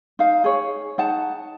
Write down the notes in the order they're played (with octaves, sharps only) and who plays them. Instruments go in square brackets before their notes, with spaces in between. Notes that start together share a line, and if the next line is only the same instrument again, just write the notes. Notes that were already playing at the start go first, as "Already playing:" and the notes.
[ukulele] D#4 F5
G#4 C#5
D#4 F#5 A5